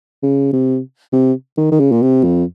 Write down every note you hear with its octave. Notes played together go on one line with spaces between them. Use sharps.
C#3
C3
C3
D#3
D#3
C#3
A#2
C3
F2